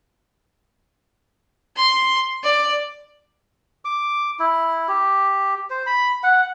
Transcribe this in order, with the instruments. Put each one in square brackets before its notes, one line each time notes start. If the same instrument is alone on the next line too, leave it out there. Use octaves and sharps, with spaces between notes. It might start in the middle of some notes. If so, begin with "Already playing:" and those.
[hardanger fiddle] C6
D5
[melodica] D6
E4
G4
C5
B5
F#5